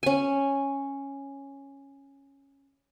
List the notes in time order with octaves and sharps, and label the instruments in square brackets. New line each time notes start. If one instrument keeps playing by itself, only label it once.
[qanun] C#4 G#5